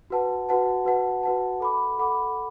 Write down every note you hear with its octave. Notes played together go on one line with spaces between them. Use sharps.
F#4 B4 F#5 A5
F#4 B4 F#5 A5
F#4 B4 F#5 A5
F#4 B4 F#5 A5
A4 F#5 B5 D6
A4 F#5 B5 D6